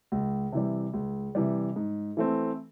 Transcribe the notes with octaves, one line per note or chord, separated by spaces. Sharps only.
C#2
C3 E3 G3
C#2
C3 E3 G3
G#2
E3 A3 C4